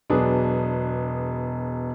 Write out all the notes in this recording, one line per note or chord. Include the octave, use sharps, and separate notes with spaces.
E1 F#3 B3 D4 G#4